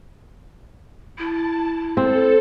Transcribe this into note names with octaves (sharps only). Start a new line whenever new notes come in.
E4 A5
C4 A4